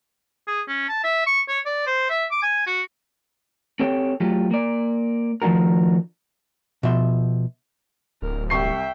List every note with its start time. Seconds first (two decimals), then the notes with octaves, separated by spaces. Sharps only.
0.47 G#4
0.68 C#4
0.88 A5
1.04 E5
1.26 C#6
1.48 C#5
1.66 D5
1.86 C5
2.10 E5
2.31 D6
2.43 G#5
2.67 F#4
3.79 C4 G4 A4 C#5 G5
4.20 F#3 A3 F4 G4
4.51 A#3 D5
5.42 D#3 F3 A3 D4 F#4 A#4
6.83 B2 F3 E5 C6
8.22 D1 A#4
8.50 C2 E5 G5 C#6 C7